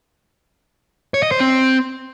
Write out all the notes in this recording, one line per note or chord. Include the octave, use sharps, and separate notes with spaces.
C#5
D#5
C5
C4